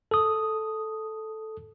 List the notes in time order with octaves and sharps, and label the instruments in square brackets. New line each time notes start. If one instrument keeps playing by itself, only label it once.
[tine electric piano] A4 D#6